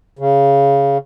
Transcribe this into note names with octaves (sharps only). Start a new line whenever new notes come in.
C#3